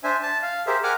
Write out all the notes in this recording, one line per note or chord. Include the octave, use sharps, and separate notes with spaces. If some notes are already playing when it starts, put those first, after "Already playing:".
D4 C5 E5 G#5
A5
F5
G4 G#4 A#4 C5 E5
A#4 F#5 G#5 A#5 D6 F6